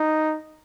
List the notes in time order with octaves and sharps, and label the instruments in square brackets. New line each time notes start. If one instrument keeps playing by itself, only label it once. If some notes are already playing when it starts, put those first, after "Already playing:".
Already playing: [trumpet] D#4